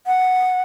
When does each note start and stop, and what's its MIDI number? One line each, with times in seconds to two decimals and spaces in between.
0.07 0.63 78